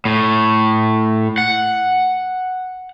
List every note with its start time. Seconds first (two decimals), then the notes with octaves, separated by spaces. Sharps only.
0.05 A2
1.38 F#5